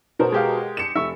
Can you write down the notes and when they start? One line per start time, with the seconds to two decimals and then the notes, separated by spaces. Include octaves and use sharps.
0.19 B2 A#4 C5
0.32 G#3 G4 F5
0.77 C#7 E7
0.96 F1 E5 C#6